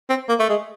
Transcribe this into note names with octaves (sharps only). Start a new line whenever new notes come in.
C4
A#3
A3
G#3